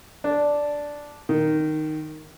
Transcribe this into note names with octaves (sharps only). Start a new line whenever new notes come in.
D4
D#3